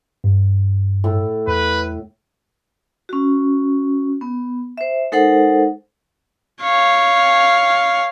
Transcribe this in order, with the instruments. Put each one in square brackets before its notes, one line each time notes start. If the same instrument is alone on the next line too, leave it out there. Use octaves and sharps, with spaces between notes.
[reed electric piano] G2
[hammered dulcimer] A2
[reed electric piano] E2 [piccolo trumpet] B4
[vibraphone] C#4 F#4
B3
C5 E5
G#3 D#4 A4 A#4 C5 F#5
[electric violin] C#5 F5